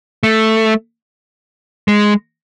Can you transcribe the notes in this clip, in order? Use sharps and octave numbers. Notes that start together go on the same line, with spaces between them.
A3
G#3